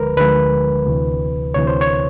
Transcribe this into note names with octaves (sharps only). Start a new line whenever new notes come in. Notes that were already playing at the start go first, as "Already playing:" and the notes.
Already playing: D2 D3 F3 G#3 A#4 B4
D2 D3 F3 G#3 B4
D2 C3 E3
D2 C3 E3 C#5
C5
C#5